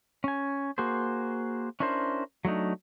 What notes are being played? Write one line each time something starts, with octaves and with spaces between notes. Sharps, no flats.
C#4 G#5
A#3 F#4 G#4 C5
C#4 D4 E4 A#4 C5
F#3 A3 D4 D#4